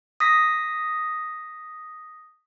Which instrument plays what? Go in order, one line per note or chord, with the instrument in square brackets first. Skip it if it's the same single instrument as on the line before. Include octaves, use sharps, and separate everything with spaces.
[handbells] D#6 A#6 B6